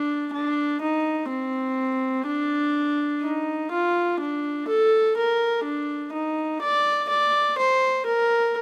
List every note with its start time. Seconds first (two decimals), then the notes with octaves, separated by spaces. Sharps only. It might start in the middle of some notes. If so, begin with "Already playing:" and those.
Already playing: D4
0.33 D4
0.81 D#4
1.29 C4
2.26 D4
3.22 D#4
3.71 F4
4.20 D4
4.68 A4
5.17 A#4
5.65 D4
6.13 D#4
6.62 D5
7.09 D5
7.58 C5
8.06 A#4